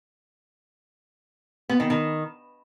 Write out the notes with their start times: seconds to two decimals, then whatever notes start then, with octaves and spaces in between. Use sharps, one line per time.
1.69 B3
1.80 D#3
1.90 D#3